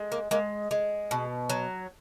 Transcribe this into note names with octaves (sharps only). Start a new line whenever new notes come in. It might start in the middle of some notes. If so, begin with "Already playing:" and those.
Already playing: G#3
A#3
G#3 A#3
G#3
B2
F#3